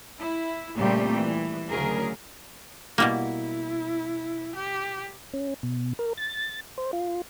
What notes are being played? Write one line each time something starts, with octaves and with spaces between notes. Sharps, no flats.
E4
A#2 C#3 G3 A3 C4 G4
E3
D2 C#3 F#3 G#4 A#4
B2 G3 A#3 E4
G4
C#4
B2
A#4
A6
C5
F4